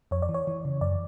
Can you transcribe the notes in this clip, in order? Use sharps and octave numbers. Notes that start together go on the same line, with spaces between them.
F2 C#5
D5
E3
C#5
E3
C#3
F#2 D5